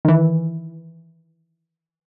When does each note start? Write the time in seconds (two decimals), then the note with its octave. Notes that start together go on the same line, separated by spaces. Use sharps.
0.05 D#3 E3